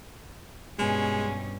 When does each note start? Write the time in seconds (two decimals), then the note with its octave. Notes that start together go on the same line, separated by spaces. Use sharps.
0.78 G2 B2 G#3 C#4 G#5